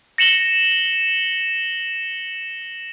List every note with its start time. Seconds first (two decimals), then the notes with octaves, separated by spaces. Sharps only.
0.18 A#6 C#7 E7 F#7 G7